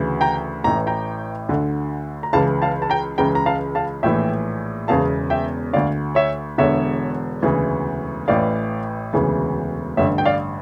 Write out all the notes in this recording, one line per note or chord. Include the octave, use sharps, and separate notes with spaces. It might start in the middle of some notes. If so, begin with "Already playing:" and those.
Already playing: D2 C#3 E3
G5 A#5
A1 A2 E3 A#5
G5 A#5
D2 D3
A#5
C#2 C#3 E3 F5 A5
F5 A5
A5
G5 A#5
C#2 C#3 E3 G5 A#5
A#5
F5 A5
F5 A5
A#1 A2 E3 E5 G5
E1 E2 C#3 E3 F5 A5
E5 G5
D2 D3 D5 F5
C#5 E5
E1 E2 D3 C#5 E5
E1 D2 C#3 E3
A1 A2 E3 D5 F5
E1 D2 C#3 E3
A1 G2 D3 C#5 E5
G5
D5 F5